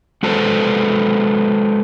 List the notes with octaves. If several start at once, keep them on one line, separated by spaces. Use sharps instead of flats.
G#3 F#4 A4 B4 C5